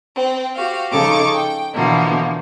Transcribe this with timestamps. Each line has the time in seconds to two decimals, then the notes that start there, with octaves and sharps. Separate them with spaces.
0.16 C4
0.56 F#4 G4 F5
0.91 C#3 F3 D#4 A4 C#6 D6
1.34 G5
1.73 B2 D3 E3 F3 A#3 B3